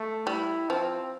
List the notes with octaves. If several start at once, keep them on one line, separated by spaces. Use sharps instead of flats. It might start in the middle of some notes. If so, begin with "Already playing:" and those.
Already playing: A3
G3 E4
F3 C4